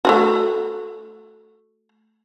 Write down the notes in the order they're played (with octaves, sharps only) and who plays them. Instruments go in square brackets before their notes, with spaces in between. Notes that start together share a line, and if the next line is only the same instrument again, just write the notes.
[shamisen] A3 F4 F#4